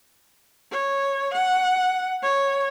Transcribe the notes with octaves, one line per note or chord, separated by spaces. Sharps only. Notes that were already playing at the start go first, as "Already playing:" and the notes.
C#5
F#5
C#5